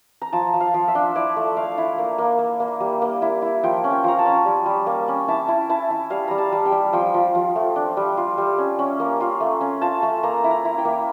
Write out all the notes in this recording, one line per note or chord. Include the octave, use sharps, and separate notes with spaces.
A#5
F3 A5
F3
F5
F3
E5
D4
E4 D5
A3
A3 F5
E4
A#3
A#3
A#3
A#3
G3
A#3
E4
E4
F3 G5
C#4
G5
F3 A#5
A5
C#4
G3
G3
A#3
C#4
E4 A5
E4
E4 A5
E4
G3 F5
G3 A#5
A5
G3
G5
G3
F3 G5
F3
F3
A3
D4
G3
F4
G3
C#4
C#4
A#3
F4
A3
C#4
F4 A5
A3
A#3 A#5
E4
A#5
E4
G5
A#3